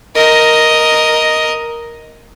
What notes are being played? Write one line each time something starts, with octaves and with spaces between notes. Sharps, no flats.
A#4 D#5